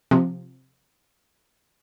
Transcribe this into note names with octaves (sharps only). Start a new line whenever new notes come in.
C3 F3